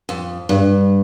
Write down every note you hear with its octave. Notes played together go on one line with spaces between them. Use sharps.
F2
G2